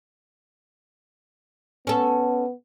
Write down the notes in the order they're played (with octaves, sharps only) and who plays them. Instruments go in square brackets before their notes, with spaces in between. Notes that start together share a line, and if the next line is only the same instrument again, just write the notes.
[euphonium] B3 [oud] C#4 A4